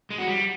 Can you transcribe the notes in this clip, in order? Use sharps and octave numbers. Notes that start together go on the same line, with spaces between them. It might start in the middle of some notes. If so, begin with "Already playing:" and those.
G#3
F#4
G3